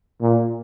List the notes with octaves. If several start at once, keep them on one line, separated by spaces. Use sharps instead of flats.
A#2